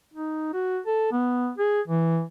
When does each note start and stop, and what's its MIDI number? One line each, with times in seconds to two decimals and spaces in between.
0.14 0.49 63
0.53 0.80 66
0.86 1.11 69
1.12 1.51 59
1.58 1.81 68
1.88 2.22 52